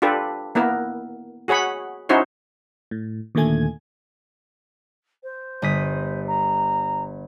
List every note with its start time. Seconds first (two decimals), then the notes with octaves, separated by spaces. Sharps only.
0.02 D4 F4 G4 A4 B4
0.55 A#3 B3 E4 A#4
1.48 F#4 G#4 C#5 F#5 B5
2.09 C#4 D#4 E4 F#4 C5 C#5
2.91 A2
3.35 D#2 A#2 D3 A3 G#5 G#6
5.23 C5
5.62 G1 D#6 B6
6.27 A#5